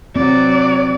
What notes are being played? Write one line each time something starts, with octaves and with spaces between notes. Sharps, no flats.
F#3 C4 D5